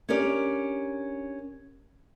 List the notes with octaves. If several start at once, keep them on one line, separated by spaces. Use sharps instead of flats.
C#4 D4 G4 A#4 D5